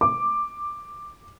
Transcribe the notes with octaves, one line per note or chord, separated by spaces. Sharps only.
D6